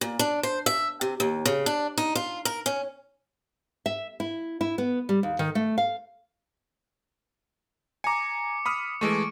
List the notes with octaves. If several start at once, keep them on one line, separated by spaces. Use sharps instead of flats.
A#2
D4
C5
E5
C3
D#2
C#3
D4
D#4
F4
A#4
C#4
E5
E4
E4
B3
G3
D#2
D#3
A3
F5
G#5 A#5 D6 C#7
B5 D#6 F6
E3 G#3 A3 C#6 D7